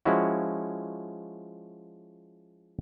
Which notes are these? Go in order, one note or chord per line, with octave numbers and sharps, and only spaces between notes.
F3 G#3 C#4 E4 F#4